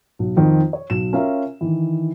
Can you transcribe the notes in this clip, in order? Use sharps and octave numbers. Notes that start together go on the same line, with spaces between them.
B1
F2 D#3 C4
C#5
B1 E7
C#4 F4 A#4 E5 F5 A#5
D#3 E3